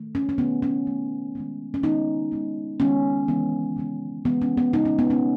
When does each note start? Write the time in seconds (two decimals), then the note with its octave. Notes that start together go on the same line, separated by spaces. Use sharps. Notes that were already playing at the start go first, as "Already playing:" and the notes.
Already playing: D#3 A3
0.15 C#4
0.29 C#4
0.38 D#3 A3 B3
0.62 C#4
0.87 D#3 A3
1.35 D#3 G#3 B3
1.74 C#4
1.83 D#3 G#3 B3 D#4
2.31 D#3 G#3 B3
2.80 D#3 G#3 B3 C#4
3.28 C#3 E3 G#3 B3
3.76 C#3 E3 G#3 B3
4.25 C#3 E3 G#3 B3
4.42 C#4
4.57 B3
4.73 C#3 E3 G#3 B3 D#4
4.85 C#4
4.99 B3
5.10 C#4